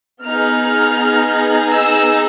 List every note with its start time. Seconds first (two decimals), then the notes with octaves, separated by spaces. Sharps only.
0.23 B3 D#4 G#4 F6
1.70 E6